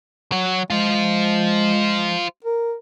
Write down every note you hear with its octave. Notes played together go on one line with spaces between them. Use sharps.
F#3
G#3 F4 C5
A#4